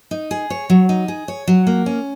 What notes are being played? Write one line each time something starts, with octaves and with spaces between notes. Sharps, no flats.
D#4
G#4
C#5
F#3
D#4
G#4
C#5
F#3
A#3
C#4